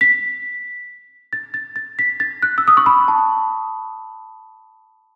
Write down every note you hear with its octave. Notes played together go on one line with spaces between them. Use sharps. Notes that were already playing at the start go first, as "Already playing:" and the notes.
B6
A6
A6
A6
B6
A6
F#6
E6
D#6
C#6
B5
A5